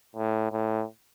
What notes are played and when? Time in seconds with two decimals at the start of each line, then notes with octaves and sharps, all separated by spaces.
0.16 A2
0.52 A2